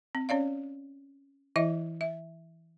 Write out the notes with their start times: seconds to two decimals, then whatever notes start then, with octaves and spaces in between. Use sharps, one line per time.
0.15 C4
0.29 C#4 C#5 D5 F5
1.56 E3 E4 D#5 E5
2.01 E5